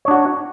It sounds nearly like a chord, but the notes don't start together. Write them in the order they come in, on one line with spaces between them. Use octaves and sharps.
C#5 D4 F#4